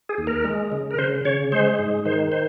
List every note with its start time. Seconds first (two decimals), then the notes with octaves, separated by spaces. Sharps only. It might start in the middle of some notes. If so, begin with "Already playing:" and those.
0.09 G#4
0.18 D#2
0.27 A#4
0.44 G#3
0.72 C#3
0.91 A#4
0.98 C#3 C5
1.25 C#3 C#5
1.52 G#3 C5
1.79 G#2
2.05 D#3 C5
2.32 C5